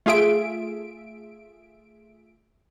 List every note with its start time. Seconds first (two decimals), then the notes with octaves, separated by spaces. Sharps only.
0.06 A3 F4 G#4 E5 D7